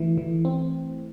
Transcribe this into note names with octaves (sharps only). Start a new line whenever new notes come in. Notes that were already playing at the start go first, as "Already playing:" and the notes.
Already playing: E3 A3
E3
C4